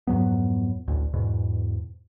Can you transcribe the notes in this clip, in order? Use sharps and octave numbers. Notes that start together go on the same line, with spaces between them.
F2 G#2 F#3 B3
A1 D2
E2 G#2 B2